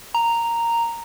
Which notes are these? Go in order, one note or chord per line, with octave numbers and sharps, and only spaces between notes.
A#5